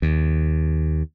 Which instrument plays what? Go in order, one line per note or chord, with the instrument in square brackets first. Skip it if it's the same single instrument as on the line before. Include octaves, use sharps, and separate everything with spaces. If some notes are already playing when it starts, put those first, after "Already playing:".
[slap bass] D#2